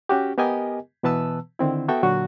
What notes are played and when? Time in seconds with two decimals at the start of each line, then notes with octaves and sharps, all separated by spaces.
0.09 C#4 F#4 G4
0.38 B3 G4 A#4 D#5 G#5
1.03 B2 E3 B3 B4 A5 E6
1.59 D3 D#3 C4 E4
1.88 B3 F#4 A4 E5 G5
2.03 A#2 D3 F#3 F#4